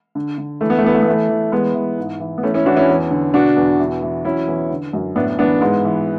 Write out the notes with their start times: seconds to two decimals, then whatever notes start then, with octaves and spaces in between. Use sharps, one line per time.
0.15 D3
0.38 D3
0.61 E3 A3
0.70 B3
0.78 A3
0.84 E3 B3
0.94 A3
1.02 B3
1.06 E3 A3
1.29 E3
1.52 E3 G#3 B3
1.74 E3
1.98 G#2
2.20 E3
2.38 B3
2.43 E3 A3 C#4
2.54 C#4 E4
2.65 E3 D4 F#4
2.77 C#4 E4
2.89 E2
3.11 D3
3.33 B2 D4 F#4
3.56 E2
3.79 E3
4.02 E3
4.24 F#3 C#4 E4
4.47 E2
4.71 D3
4.93 F#2
5.16 A2 B3 D4
5.38 E3 B3 D4
5.61 G#2 G#3 B3
5.84 E3